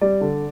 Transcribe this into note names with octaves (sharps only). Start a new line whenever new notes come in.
G3 D5
D3